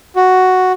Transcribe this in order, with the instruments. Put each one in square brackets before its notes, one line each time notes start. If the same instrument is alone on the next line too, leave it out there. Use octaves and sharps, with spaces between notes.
[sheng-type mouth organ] F#4